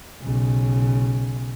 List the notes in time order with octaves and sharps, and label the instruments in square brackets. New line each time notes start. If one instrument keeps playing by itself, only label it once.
[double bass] B1 C#3